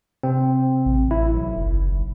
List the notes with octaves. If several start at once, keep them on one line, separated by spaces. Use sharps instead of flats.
C3 C4
A1
E4
B1
F#1